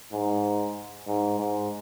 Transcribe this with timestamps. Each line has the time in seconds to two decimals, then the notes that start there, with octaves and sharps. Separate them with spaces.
0.12 G#2
1.07 G#2
1.39 G#2